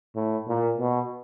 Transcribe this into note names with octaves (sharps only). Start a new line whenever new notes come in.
A2
A#2
B2